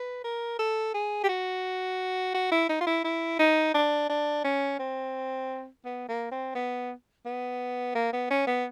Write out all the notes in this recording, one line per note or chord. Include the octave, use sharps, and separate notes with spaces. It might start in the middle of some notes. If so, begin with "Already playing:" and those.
Already playing: B4
A#4
A4
G#4
G4
F#4
F#4
E4
D#4
F4
E4
E4
D#4
D4
D4
C#4
C4
B3
A#3
C4
B3
B3
A#3
B3
C#4
B3